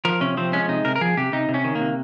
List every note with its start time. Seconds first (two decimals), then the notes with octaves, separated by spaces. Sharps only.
0.05 F3 A#4
0.21 C3 C#4
0.37 F3 C4
0.53 G#3 C#4
0.69 C3 D#4
0.85 C3 A#4
0.96 A#4
1.01 F3 G#4
1.17 C3 G4
1.33 C3 D#4
1.49 C3
1.54 C#4
1.64 D#3
1.75 A#3
1.81 C3